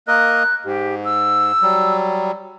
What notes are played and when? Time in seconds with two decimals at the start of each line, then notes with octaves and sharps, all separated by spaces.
0.08 A#3 A#4 D#5 F#6
0.65 G#2 G4
1.05 E6
1.63 F#3 G3